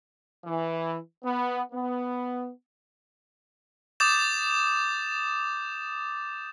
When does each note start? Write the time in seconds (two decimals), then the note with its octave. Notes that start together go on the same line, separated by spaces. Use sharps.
0.45 E3
1.24 B3
1.73 B3
4.00 D6 D#6 G6 A6 E7